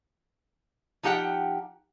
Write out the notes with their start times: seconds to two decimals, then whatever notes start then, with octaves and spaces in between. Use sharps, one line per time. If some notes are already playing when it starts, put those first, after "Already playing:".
1.03 F3 D#4 G4 F#5 G5